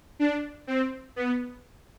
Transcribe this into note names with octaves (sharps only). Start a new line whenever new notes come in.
D4
C4
B3